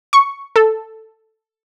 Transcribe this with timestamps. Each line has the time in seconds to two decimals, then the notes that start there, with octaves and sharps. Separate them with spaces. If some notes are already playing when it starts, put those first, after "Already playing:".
0.13 C#6
0.56 A4